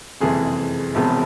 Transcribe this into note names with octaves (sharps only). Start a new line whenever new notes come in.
F#1 F2 C3 E3 G#3 G#4
E1 E2 C3 F3